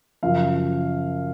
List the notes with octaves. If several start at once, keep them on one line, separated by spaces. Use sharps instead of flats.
F#2 C#3 F3 F5